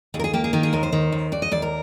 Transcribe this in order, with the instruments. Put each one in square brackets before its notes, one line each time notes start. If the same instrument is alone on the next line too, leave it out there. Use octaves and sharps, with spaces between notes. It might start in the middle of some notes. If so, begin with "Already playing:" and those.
[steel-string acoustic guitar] D#2 G#4
A#4
G#4
A#3 G4
G#4
D#3 G4
G#4
D#2 A#4
C5
D#3
D#2
D#2 D5
D#5
D#2 D5
A#4